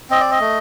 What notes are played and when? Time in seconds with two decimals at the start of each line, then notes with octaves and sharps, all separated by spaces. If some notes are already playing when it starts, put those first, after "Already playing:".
0.10 C4 D#5
0.20 D5
0.31 D#5
0.40 A3